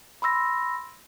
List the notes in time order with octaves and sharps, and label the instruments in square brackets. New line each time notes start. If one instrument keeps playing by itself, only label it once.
[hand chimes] B5 C6 E6 A#6